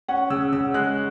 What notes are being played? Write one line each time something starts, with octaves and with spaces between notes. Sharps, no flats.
C#4 F#5
C#3 E6
C#3 E6
G#3 F#6